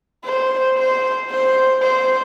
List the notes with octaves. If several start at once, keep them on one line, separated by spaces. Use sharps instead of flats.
C5
C5
C5
C5